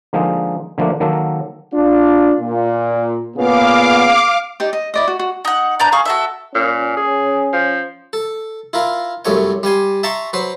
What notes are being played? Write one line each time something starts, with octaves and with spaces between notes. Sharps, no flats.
D3 F3 G#3 A#3 D#4
D3 F3 A3 A#3 D4
D#3 F#3 A#3 A4
D4 F4
A#2
A#2 C#3 B3 F5 D6
D#4 G4 D5
D#5
E4 D5 D#5
F#4
F#4
D#4 F#5
D4 B4 A#5 G6
G#4 F5 C#6
F#4 A4 E5
A#2 C#4
G#4
F3
A4
E4 F4 A#4
C2 F#2 A3 C#5 G5
G3 G5 G#5 C6
E5 G5 A5 A#5 C6 C#6
F#3 B4 C5